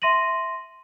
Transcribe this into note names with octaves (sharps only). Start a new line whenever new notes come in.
E5 C6 A#6 D#7 F#7